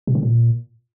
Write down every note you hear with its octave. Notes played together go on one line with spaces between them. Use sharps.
B2
D3
A#2